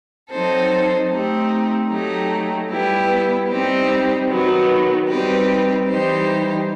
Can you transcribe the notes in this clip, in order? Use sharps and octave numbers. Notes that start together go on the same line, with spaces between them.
F#3 C4 D#4 A4 C5
A3 C4 D#4 G4
F#3 A3 D#4 G4
G3 B3 E4 G4 B4
G3 C4 D#4 G4 C5
D#3 F#3 B3 D#4
G3 C4 D#4 G4 B4
E3 G3 D#4 G4 C5